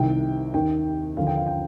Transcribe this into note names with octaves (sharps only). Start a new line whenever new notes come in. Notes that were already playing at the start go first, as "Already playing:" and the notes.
Already playing: C2 C3 D#3 G5
D#2 D#3 G5
D#2 D3 F3 F5
G5
F5
G5